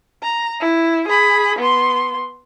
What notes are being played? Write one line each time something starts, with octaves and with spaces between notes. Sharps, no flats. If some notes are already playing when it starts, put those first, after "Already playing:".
A#5
E4
G#4 B5
B3 C6